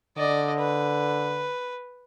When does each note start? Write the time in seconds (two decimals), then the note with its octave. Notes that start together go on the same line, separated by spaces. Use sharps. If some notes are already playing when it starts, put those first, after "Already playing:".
0.18 D3 D5 D#5
0.59 B4